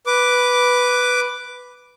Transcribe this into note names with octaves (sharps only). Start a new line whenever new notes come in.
B4 D6